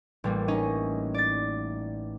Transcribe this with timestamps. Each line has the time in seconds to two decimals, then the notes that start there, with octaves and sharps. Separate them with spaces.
0.24 A1 G3 A#3
0.48 C#4 D#4 D#5
1.14 D5 A6